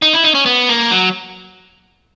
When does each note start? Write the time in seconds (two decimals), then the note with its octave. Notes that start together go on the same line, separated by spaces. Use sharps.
0.02 D#4
0.13 E4
0.24 D#4
0.35 C#4
0.46 B3
0.69 A#3
0.91 F#3